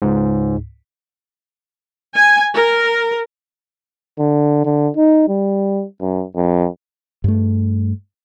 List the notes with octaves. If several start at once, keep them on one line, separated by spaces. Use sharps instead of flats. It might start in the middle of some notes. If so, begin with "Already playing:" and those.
C#2 G#2
G#5
A#4
D3
D3
D#4
G3
F#2
F2
G2 A3